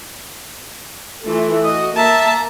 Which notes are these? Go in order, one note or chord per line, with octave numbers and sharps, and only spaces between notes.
E3 A3 F4
F#4 D#5 D#6
A#3 E5 A5 A#5